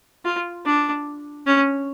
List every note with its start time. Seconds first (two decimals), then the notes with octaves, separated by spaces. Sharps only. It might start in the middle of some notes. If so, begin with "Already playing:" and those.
0.25 F4
0.66 D4
1.46 C#4